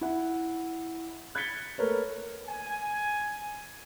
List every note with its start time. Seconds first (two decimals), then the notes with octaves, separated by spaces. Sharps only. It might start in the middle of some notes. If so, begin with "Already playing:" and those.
0.01 E4 F#5
1.35 F#6 G#6 A6 B6 C#7 G7
1.78 A3 A#3 A#4 B4 C#5
2.48 G#5